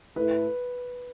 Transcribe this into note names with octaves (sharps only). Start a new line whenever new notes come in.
A2 A3 E4 B4